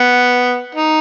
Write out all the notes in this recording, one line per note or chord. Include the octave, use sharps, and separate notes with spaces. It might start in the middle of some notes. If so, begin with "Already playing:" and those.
Already playing: B3
D#4